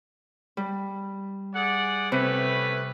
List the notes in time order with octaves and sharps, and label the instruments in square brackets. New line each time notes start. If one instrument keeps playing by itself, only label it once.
[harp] G3
[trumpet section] G#4 D5 F#5
[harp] C3 [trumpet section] A3 C#4 B4